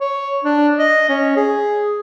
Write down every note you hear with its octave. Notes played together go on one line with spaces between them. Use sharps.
C#5
D4
D#5
C#4
G#4